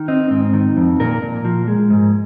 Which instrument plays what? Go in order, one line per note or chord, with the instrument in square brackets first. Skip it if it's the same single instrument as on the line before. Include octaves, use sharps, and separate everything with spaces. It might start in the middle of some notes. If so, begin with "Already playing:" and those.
Already playing: [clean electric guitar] D#3
C4 D#4
G#2 C4
D#3
F2
A#2 A#4
A#2
F3
G#3
G#2